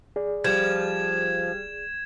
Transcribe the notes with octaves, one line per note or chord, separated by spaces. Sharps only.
G#4 D5
F3 G3 G#6 E7